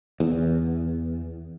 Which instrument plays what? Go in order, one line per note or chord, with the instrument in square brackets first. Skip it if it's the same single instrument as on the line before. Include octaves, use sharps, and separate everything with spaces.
[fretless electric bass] E2